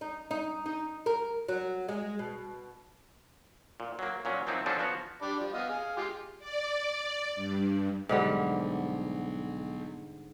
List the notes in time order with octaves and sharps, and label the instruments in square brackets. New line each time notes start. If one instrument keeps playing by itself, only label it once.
[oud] D#4
D#4
D#4
A#4
F#3
G#3
B2
[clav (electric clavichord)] A#2
F#3 A#3
A#2 F#3 C#4
F3 F#3 A#3 C4 D#4 E4
F3 F#3 C#4 D4 A4 C5
F3 B3 F#4 C#5
[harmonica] D4 G4 B5
F3 G3
B3 D#5 F5
G#4 F5
G#3 F4 G4
[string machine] D5
G2
[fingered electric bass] B1 [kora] G#2 D3 G3